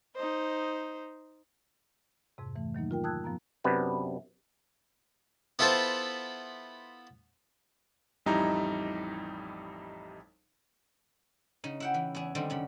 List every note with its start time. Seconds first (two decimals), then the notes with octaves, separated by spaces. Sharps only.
0.16 D#4 C5 D#5
2.38 F2 G#2 C3
2.56 E3 A3
2.75 D#3 F#3 A#3 D#4
2.91 F4 A#4 G5
3.04 G5 A5 D#6 E6 F#6 G#6
3.24 G2 F3 B3 A#5
3.64 F#2 C3 B3 D4 B4
5.59 B3 E4 F4 A4 B4 C5
8.26 A1 F2 G3 D#4 E4 A#5
11.64 C#3 D#4
11.80 E4 F#5 G5
11.94 E3
12.15 E2 E4 G#4
12.35 D3 D#3 G3 C4 D#4
12.50 F#2 C#3 B5